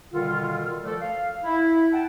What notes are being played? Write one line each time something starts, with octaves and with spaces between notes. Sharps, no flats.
B2 D3 D#3 G3 F4
F3 A3 A4 D5
F5
E4
F#5 G5 A5